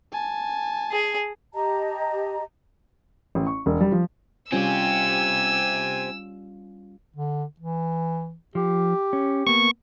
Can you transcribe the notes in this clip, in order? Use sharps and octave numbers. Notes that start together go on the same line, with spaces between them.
G#5 A5
G#4
G4 D#5 A5 A#5
A1
C#6
E1
G3
F3
G3 C4 C#4 F4 G4 G#5 E6
D3
E3
F3 G4
C#4
A#3 B3 C#6